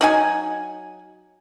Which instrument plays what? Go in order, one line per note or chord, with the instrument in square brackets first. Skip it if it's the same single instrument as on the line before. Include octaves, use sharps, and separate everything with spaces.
[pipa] F#3 D#4 G#5